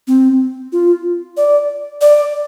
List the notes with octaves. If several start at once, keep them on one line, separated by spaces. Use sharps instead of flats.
C4
F4
D5
D5